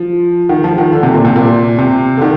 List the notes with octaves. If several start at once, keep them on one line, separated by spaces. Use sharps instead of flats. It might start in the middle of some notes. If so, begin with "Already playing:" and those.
Already playing: F3
D#3
F3
D#3
D3
C3
A#2
C3
A#2
C3
D3
D#3